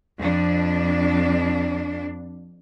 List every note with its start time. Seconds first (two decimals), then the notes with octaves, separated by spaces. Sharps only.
0.18 F2 D4